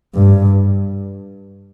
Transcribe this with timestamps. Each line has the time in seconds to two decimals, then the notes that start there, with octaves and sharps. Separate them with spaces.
0.15 G2